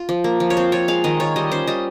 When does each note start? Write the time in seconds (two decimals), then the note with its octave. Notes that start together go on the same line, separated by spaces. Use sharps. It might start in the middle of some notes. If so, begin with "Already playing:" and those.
Already playing: F4
0.09 F3
0.24 A#3
0.40 F3
0.50 C#5
0.57 C4 C5
0.72 F4 C#5
0.88 G#3 F5
1.04 D#3 D#5
1.20 F4 C#5
1.36 G3 D#5
1.51 C#4 C5
1.67 G3 D#5